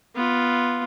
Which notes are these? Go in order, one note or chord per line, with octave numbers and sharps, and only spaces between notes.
B3 F4